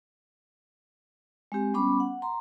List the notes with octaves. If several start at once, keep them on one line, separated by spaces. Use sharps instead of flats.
G#3 C4 G4
G3 B3 C#4 B5 D6
F#5
A#5 C6